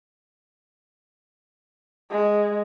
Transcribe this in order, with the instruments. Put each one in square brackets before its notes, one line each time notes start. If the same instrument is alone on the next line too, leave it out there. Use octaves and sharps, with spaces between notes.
[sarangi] G#3